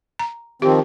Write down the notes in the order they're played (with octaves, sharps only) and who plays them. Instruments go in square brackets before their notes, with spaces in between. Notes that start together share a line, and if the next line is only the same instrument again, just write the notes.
[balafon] A#5
[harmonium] D#3 F3 C4 [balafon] G4